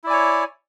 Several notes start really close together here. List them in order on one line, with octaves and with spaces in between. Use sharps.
E4 D5 G#5 C#5